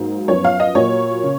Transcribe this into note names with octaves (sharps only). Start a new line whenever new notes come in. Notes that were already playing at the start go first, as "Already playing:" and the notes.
Already playing: G#2 F#3 A#3
F#2 F3 B3 C#5
F5
D#5
A#2 F#3 A#3 C#5
C#3